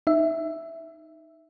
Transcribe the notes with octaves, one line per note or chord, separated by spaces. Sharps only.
D#4 E5